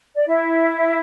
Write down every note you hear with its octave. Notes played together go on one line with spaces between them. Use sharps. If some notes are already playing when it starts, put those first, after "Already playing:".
D5
E4 E5